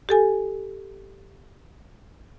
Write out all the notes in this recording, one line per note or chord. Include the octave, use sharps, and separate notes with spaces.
G4 A4 G#5